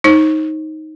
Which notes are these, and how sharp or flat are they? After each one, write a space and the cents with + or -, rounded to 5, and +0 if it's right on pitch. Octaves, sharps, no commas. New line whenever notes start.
D#4 +5 C5 +45